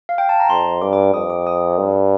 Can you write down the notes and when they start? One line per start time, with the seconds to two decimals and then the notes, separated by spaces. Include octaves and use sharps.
0.09 F5
0.18 G5
0.29 A5
0.40 A#5
0.50 F2 C6
0.82 G2 D6
0.93 D6
1.03 D6
1.14 F2 D#6
1.30 D6
1.47 D#6
1.78 G2